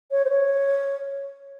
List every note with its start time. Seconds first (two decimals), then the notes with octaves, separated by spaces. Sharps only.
0.11 C#5
0.25 C5
0.29 C#5